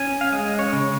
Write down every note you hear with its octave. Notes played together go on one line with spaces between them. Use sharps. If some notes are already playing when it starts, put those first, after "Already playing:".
Already playing: C#4 G#5
F5
G#3 D#5
C#5
C#3